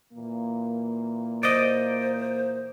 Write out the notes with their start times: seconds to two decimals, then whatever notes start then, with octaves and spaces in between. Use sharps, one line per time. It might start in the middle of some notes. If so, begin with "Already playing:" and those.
0.13 A#2 E3 A#3
1.43 C5 D5 D#5